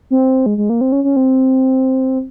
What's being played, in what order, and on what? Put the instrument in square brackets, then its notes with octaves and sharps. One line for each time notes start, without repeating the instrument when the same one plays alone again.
[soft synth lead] C4
G#3
G#3
A#3
C4
C#4
C#4
C4